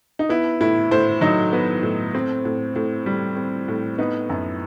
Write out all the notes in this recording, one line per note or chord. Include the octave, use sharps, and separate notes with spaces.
D#4
B3 E4
A2 E4
A2 C5
F#3 D#4
B3
A2
C4
A2
A2
G3
C4
A2
B3 D#4
F#2